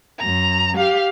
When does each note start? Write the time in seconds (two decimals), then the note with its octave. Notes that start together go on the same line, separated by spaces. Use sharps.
0.18 F#2 A#5
0.77 G4 F5